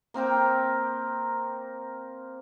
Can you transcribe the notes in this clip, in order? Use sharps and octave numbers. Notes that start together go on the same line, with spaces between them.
A#3 C4 A#4 G5